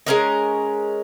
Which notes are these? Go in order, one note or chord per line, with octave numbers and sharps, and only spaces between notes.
G#3 C#4 A#4 D#5